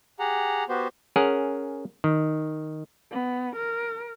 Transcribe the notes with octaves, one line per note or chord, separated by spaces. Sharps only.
G4 G#4 F#5 A#5
B3 F#4 G4 C5
C#4 G#4 A#4 F#5
D#3
B3
A#4